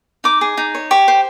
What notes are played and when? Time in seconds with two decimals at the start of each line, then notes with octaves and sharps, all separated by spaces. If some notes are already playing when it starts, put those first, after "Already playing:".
0.24 D#4 D6
0.41 G#4
0.57 D#4
0.75 C#5
0.91 G4 C#6
1.08 C5